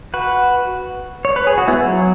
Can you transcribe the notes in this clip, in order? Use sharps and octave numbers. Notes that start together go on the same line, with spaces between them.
F#4 B4
C#5
B4
G#4
F#4
B3 E4
F#3